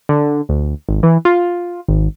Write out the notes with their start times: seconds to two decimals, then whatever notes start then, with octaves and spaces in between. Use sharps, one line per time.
0.09 D3
0.49 D2
0.89 G#1
1.03 E3
1.25 F4
1.88 G#1